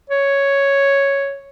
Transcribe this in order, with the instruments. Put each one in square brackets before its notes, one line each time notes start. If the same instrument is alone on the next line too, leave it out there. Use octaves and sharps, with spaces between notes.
[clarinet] C#5